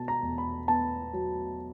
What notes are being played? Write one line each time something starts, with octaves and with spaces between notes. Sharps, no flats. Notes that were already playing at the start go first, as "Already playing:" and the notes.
Already playing: B2 A5
A#5
E2
B5
B3 A5
F#3